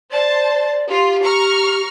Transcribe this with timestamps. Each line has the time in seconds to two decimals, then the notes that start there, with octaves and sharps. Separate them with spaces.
0.11 C5 D5 A5
0.89 F4 G4
1.22 A#5 C#6 F6